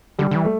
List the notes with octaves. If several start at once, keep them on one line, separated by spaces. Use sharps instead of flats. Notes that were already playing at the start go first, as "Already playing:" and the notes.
D3 G3
D3
E3
A3